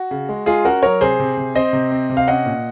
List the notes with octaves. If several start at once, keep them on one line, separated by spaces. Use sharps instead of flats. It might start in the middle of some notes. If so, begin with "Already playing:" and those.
Already playing: F#4
C#3
G#3
G#3 F4 G#4
C#4 F#4 A#4
F#3 A#4 C#5
C3 G#4 C5
C3
C3
C4 C5 D#5
C3
C4
C3
F5
C#4 D#5 F#5
A#2